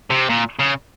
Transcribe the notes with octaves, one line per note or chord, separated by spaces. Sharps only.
C3
A#2
C#3